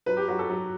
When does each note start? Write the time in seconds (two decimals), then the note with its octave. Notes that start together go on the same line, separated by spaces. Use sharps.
0.06 F#3 B4
0.17 G4
0.28 F#3 F#4
0.39 A4
0.50 F#3